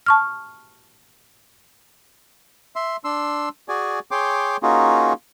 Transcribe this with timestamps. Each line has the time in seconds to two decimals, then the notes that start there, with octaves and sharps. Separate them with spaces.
0.06 A5 C#6 F6
2.76 E5 C6
3.04 D4 C6 E6
3.69 F#4 G#4 D5 G#5
4.11 G#4 C#5 G5 C6 D6
4.63 A#3 C#4 D#4 F4 F#4 G#4